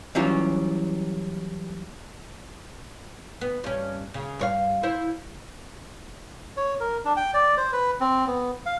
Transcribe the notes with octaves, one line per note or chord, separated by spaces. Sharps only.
E3 F#3 G3 C#4 F4 F#4
B3
G2 C#4
C#3
G2 C#5 F5
E4 C5
C#5
A#4
D4
G5
D5
C5
B4
C4
B3
F5